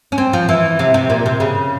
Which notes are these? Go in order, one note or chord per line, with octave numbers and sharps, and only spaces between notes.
C#4
C4
F3
E3
C3
C3
A#2
C3
C#3